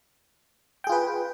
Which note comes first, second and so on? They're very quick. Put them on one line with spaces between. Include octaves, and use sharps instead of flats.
G5 G#4 F4 B4